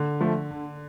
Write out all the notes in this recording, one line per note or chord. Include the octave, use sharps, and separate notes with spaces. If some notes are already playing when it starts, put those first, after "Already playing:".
Already playing: D3
F3 A3
D3